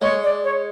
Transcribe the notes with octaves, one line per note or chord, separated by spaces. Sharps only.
G#3 C#5
D5
C#5